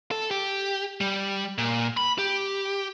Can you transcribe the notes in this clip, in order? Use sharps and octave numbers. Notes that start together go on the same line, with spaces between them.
A4
G4
G3
A#2
B5
G4